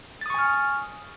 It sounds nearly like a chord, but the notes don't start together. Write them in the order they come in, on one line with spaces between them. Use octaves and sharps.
A6 D#6 C#6 G#5 F6